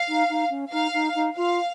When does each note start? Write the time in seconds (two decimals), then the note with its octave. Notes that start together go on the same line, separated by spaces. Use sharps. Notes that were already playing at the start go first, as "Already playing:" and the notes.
Already playing: F5
0.08 D#4
0.29 D#4
0.50 C#4
0.71 D#4 F5
0.93 D#4
1.15 D#4
1.36 F4 F5